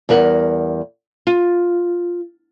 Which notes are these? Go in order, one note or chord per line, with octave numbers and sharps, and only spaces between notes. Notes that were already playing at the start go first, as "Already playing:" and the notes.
E2 G3 A#4 F#5
F4